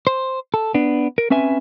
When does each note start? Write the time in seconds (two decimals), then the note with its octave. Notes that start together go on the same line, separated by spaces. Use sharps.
0.07 C5
0.54 A4
0.74 B3 D4
1.18 A#4
1.30 C4 C#4 B4 E5 G#5